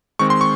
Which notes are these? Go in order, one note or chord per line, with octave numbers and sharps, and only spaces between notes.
D#3 G#3 C4 C#6
C6
C#6